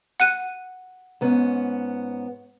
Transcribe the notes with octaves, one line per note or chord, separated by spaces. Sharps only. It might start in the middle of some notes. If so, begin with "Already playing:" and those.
F#5 F#6 D#7
G#2 B3 C#4